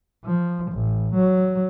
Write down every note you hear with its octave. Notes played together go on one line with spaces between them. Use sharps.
F3
A1
F#3